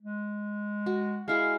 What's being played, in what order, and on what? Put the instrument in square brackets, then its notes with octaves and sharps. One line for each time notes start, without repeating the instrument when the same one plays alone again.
[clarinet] G#3
[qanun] F#4
[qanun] G#3 E4 G#4 [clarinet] F5